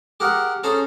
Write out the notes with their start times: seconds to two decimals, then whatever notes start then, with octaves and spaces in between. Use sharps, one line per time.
0.20 G4 G#4 A#4 F#5
0.64 C#4 G#4 A4 C5 A#5